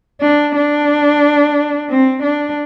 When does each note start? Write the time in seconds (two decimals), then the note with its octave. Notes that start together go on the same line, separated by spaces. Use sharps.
0.21 D4
0.56 D4
1.89 C4
2.24 D4